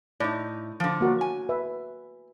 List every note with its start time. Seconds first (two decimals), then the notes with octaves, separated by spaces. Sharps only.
0.20 A2 D#4 D5
0.80 D3 F3
1.01 A#3 F#4 A#4
1.21 G#5
1.49 B4 E5